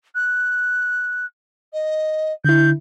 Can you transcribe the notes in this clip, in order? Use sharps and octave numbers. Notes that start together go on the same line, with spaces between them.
F#6
D#5
D3 E4 G6